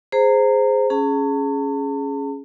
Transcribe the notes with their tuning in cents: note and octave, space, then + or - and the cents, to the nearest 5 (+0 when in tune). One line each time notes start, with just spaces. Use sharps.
G#4 +0 C5 -10 A#5 -20
C#4 +0 G#4 +15 A5 +45